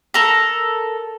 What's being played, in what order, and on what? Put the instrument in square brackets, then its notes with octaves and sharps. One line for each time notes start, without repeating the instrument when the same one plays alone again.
[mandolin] A4 A#4